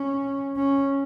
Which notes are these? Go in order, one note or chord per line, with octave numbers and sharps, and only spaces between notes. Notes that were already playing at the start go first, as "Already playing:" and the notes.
Already playing: C#4
C#4